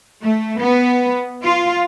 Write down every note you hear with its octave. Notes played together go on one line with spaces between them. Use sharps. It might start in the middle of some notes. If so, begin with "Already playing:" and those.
A3
B3
F4